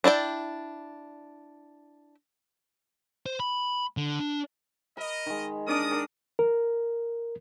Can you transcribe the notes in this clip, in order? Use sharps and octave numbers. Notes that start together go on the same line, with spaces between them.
D4 E4 D5 G5
C5
B5
D3
D4
A#4 D#5 B5
D#3 G#3
D4 A#4 D#6
A#4